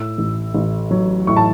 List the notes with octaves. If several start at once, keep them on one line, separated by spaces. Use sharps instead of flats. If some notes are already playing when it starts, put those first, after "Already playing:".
Already playing: A2 E6
A1
A1
F#3
A2 C#6
A5